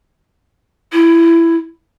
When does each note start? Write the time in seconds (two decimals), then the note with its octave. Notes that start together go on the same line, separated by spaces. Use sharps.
0.93 E4